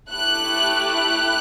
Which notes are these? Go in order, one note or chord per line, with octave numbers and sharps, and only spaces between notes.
A3 E4 G4 F#6
F#6